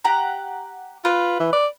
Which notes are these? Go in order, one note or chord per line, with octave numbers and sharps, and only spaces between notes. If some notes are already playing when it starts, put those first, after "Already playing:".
G4 F#5 A#5
F4 B4
E3
D5